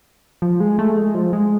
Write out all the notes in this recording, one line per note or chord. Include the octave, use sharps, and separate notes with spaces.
F3
G#3
A3
G#3
F3
G#3